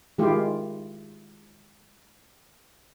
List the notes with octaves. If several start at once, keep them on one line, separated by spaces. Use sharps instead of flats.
D#3 G#3 E4 F4 G4